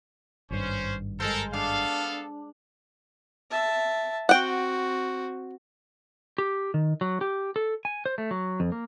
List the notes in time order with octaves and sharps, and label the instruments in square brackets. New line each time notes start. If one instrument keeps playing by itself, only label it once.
[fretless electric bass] G#1 G2 [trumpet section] C#4 C5
[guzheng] G#3 C5 [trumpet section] A4 A#4
[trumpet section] B3 A4 F5 [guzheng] D4
[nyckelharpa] E5 A5
[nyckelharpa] C4 F#4 [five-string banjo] F#5 G5
[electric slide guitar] G4
D#3
F#3
G4
A4
G#5
C5
A3
F#3
F2
A#3